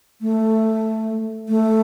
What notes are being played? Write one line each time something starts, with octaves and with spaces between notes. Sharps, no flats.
A3
A3